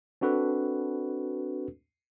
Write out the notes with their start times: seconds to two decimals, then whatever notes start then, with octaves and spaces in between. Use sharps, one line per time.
0.21 C4 D4 F#4 A4 B4